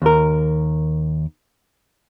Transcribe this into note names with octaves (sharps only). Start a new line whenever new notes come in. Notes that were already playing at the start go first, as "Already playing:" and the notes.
D#2 A#4